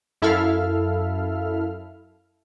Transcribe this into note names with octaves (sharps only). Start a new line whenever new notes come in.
F#2 E4 A4 E5 F5 F6